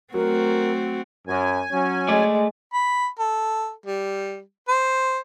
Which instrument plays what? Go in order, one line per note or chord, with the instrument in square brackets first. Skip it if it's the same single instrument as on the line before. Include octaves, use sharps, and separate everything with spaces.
[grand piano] F#3 [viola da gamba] A3 C4 F#4 [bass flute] A#4
[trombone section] F#2 [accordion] G#5
[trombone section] F#3 C#4
[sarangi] G#3 [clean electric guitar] A3 D5
[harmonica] B5
A4
G3
C5